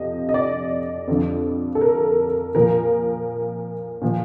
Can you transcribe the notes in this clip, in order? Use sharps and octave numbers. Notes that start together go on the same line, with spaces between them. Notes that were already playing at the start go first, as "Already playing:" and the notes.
Already playing: F2 C3 F3 D#5
D#5
D5
F2 D3 F3
A4
A#4
A#2 F3 A#4
A#2 F3